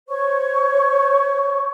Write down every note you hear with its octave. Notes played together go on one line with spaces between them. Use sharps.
C5 C#5 C#6